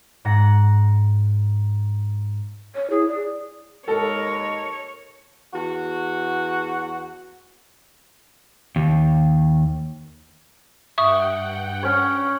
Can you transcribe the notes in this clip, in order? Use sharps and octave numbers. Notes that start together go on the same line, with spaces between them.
G#2 F#5 A#6
C#5
E4 G#4
D5
D#2 G#3 A4 A#4 C#5
E2 F#4
D#2
G2 E5 F#5 G5 C#6 D#6
C#4 C#5